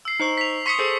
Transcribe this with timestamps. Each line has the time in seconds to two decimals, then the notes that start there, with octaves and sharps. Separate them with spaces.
0.05 E6 C7
0.20 D#4 C5 C#6
0.38 B6 F7
0.66 C6 C#6 D#6 B6 C#7
0.79 G#4 A4 C5